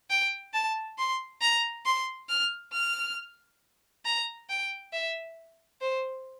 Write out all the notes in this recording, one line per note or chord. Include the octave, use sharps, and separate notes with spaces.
G5
A5
C6
A#5
C6
F6
F6
A#5
G5
E5
C5